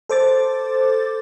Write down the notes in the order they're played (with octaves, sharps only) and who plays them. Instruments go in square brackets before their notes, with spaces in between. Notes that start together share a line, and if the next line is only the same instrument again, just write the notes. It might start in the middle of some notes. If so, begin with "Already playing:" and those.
[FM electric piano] A4 C5 D6 A6